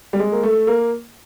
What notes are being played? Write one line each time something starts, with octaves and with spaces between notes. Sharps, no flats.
G3
G#3
A#3
A3
A#3